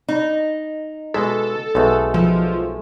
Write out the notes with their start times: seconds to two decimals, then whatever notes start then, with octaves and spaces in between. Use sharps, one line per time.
0.08 D#4
1.14 B2 G#3 A4 E5
1.75 B1 G#3 A3
2.14 F3 A4